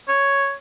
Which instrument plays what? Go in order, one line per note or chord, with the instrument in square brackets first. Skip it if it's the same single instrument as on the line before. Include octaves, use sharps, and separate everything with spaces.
[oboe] C#5